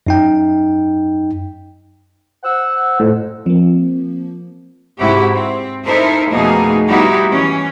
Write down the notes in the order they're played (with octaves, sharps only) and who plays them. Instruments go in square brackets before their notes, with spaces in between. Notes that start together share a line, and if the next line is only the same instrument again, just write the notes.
[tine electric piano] F#2 D#4 G5
[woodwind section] C5 F#5 E6
[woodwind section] F2 [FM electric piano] A2
[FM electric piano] F3 A#3 [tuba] C4
[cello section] G#2 C3 E4 F#4 G4
C4
D#4 E4 A4 A#4 C5 E5
F2 B2 A3 A#3 D#4 G#4
G3 B3 D#4 E4 F#4 G4
E3 C#4